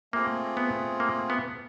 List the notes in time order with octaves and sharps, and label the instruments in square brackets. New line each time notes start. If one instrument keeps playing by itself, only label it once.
[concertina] A3 C4 F4 G#4 [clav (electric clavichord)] A#3
[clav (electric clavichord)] B3
A#3
B3